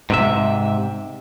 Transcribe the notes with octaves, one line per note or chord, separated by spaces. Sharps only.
G#2 C3 E5